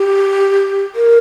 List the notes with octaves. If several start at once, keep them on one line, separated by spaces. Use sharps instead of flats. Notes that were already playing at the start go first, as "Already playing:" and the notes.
Already playing: G4
A#4